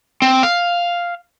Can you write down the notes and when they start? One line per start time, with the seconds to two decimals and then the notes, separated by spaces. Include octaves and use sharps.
0.22 C4
0.43 F5